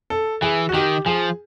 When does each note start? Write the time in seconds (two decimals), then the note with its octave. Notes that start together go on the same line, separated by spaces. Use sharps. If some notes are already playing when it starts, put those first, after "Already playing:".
0.10 A4
0.42 E3 G#4
0.69 F#4
0.74 D#3 G4
1.06 F3 G#4